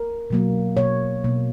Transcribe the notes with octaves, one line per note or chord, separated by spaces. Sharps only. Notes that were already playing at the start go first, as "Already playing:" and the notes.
Already playing: A#4
B2 F#3 A#3
B2 A#3 C#5
B2 A#3